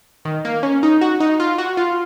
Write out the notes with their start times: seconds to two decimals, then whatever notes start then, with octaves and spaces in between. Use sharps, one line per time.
0.25 D#3
0.45 A#3
0.63 C#4
0.83 D#4
1.01 F#4
1.20 D#4
1.40 F4
1.58 F#4
1.77 F4